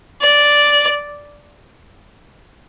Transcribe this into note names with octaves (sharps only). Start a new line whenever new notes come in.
D5